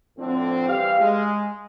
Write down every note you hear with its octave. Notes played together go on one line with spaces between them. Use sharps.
A2 D3 F3 C4
E3 G3 G4 F5
G#3